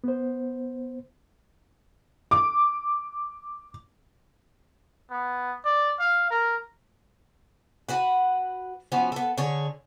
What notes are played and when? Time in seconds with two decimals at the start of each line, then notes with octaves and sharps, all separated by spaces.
0.04 B3 C5
2.31 D6
5.11 B3
5.65 D5
5.99 F5
6.31 A#4
7.88 F#4 B4 F#5
8.92 F3 B3 C#4 F#4
9.12 B3 A4
9.38 D3 G#4 C#5